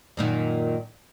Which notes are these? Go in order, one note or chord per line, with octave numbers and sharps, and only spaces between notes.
F#2 A#2 D#3